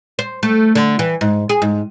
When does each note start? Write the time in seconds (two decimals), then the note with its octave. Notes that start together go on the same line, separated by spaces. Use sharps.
0.19 C5
0.43 A3
0.75 D3
0.99 E3
1.21 G#2
1.49 G#4
1.62 G#2